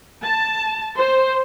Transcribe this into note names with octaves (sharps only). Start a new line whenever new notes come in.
A5
C5